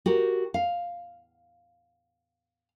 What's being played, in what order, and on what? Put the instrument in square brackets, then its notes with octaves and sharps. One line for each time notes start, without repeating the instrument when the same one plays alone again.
[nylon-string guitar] F#4 G4 A#4
F5